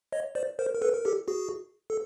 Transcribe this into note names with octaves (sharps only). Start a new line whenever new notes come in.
C#5 D#5
C5 D5
A#4 C5
A#4
A4 B4
A#4
G4 A4
F#4 G#4
A4